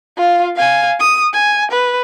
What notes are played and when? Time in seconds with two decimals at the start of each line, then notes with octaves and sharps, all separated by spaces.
0.17 F4 F5
0.56 F5 G#5
1.00 D#6
1.33 G#5
1.71 B4